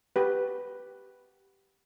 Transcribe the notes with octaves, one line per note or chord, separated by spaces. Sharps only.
G4 B4